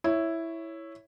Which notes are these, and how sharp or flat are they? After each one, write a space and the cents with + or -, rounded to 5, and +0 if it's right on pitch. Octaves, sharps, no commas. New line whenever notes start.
E4 +0 C#5 +0